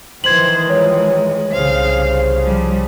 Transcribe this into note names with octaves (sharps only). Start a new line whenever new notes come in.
D#3 E3 C5 G#6 F#7
F3 G#3 C#5
C2 C#3 C5 F5
F3 G3